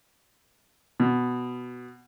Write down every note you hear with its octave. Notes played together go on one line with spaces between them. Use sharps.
B2